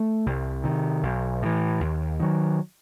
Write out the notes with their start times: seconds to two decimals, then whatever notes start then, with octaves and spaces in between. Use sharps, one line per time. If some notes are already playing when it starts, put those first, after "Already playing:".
Already playing: A3
0.26 C2
0.64 C3 D#3
1.03 B1
1.42 A2 E3
1.80 D#2
2.20 D#3 F#3